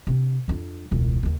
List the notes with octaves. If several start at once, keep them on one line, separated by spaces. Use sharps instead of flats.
C3 D4
F2 D4
E1 C#2
D#2 C#3